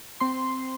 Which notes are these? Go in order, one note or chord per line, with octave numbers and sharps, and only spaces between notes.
C4 C6